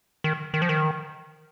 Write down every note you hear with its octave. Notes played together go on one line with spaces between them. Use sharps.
D#3
D#3
F3
D#3